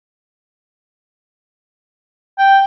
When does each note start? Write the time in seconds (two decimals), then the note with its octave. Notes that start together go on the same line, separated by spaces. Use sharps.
2.38 G5